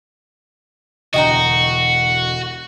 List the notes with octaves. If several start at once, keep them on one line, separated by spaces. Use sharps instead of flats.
E1 D2 D3 F#4 D#5 G5 A#5